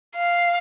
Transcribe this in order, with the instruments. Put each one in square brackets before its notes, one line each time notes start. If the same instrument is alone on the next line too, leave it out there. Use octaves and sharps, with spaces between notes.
[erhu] F5